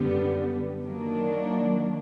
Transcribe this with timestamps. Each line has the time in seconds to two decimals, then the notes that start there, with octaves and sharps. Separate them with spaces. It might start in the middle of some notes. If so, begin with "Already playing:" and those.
Already playing: F#2 D3 G3 B3
0.84 D#3 F#3 A#3 D4